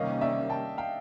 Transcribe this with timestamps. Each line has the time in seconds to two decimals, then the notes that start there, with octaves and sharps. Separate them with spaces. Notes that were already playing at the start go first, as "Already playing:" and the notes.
Already playing: C3 D#3 G3 A#3 C#4 D#5 F5
0.21 D5 E5
0.49 G5 A5
0.78 F5 G5